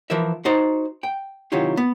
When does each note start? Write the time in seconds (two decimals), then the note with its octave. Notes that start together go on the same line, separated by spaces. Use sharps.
0.10 E3 F3 A#4 E5
0.45 D#4 F#4 C5 A#5
1.03 G5
1.52 C3 D#3 F#3 E4 F4 G4
1.77 B3